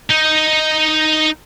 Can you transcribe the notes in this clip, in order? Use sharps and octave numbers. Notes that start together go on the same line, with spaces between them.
D#4